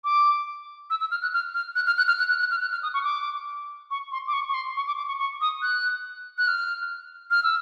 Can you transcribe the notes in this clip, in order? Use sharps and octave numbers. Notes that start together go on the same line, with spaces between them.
D6
E6
E6
F6
F#6
F6
F6
F#6
F6
F#6
F6
F#6
F#6
F#6
F6
F#6
F6
D#6
C#6
D6
C#6
C6
D6
C#6
C#6
C6
C#6
D6
D6
C#6
C#6
D#6
F#6
F#6
F6
F6
E6